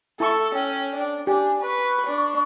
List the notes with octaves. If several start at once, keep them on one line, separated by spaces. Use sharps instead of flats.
E4 A4 A5 C#6 E6
C#4 G5
D4
D4 G4 G#5
B4 C#6
D4